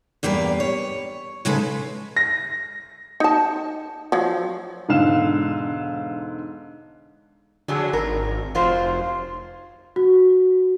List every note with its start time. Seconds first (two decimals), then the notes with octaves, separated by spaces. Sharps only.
0.23 E2 G2 G3 A#3 B4
0.60 C#5
1.45 D#2 C#3 G#3 A4 B4
2.17 A#6
3.20 D#4 A5
4.12 F3 F#3
4.89 E1 G#2 D3 F5 E7
7.68 F2 D3 F#3 G#4
7.93 G#1 A#4
8.55 F1 F#3 F4 C5
9.96 F#4